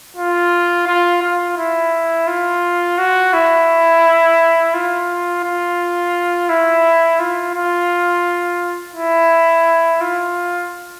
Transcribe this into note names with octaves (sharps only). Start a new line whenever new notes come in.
F4
F4
F4
E4
F4
F#4
E4
F4
F4
E4
F4
F4
E4
F4